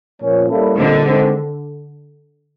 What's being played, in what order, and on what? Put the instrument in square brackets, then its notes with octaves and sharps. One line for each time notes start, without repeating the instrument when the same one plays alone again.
[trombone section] A#2 F3 A#3 C#4
G3 A#3 C#4 E4 A4
[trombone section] A#2 G3 C4 D#4 [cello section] D3
[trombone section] D#3 G#3 C4